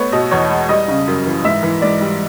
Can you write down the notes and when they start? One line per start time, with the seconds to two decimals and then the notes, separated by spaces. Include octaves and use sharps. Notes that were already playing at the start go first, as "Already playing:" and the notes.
Already playing: A3 B3 C#5
0.12 B2 D#5
0.31 E2 C#5
0.50 G#3
0.69 G3 D#5
0.88 C#3
1.08 F#2
1.26 E3
1.44 G#2 E5
1.63 E3
1.82 G#2 D5
2.01 G3